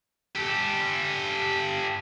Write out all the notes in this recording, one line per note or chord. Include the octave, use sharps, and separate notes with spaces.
G4 A4